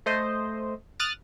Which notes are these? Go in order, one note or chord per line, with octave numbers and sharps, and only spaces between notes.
A3 C5 D#5
D#6 F6 F#6 A6 D7